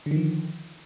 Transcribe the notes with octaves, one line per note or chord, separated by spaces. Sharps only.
D3 D#3 F3